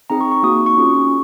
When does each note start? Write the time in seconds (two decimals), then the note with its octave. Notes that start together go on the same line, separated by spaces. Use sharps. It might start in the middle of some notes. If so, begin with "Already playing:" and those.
0.10 C4 D#4 G#4 A#5
0.21 C#6
0.32 C#6
0.43 A#3 D#4 F#4 D#6
0.66 C#6
0.77 C#4 F4 G#4